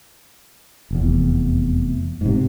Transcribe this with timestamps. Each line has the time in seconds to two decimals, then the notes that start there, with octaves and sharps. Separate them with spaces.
0.91 F1 E2
2.21 G#2 C3